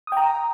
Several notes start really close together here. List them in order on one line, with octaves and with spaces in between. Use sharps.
D#6 G5 A#5